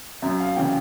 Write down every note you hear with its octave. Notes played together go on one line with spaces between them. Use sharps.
F#2 E5
F5
C#3 E3 G5